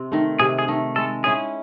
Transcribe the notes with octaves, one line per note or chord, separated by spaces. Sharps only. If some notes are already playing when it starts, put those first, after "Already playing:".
Already playing: C3 C4
D#3 A3
C3 G#4
G#4
D#3 A3
G#3 A4
C#4 E4 G#4